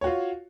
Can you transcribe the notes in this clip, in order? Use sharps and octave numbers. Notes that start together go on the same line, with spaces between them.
F4 F#4 C#5